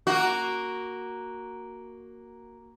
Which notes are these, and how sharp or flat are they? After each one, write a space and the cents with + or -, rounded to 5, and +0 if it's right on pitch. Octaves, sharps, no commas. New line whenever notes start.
A#3 +0 F#4 +0